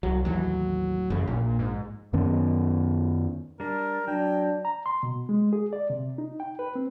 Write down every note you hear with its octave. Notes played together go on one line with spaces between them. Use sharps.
C2 F#3
A1 D#2 E3 F#3
A1 F#2 C#3
A#1 A#2
G#2
F#2 D#3 B3 C#4
G3 D4 A#4
F#3 D4 G5
A#5
C6
B2
G#3
G#4
D5
C3
D#4
G5
B4
C4